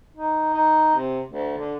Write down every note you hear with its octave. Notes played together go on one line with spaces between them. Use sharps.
D#4
D#4
C3
D2
D3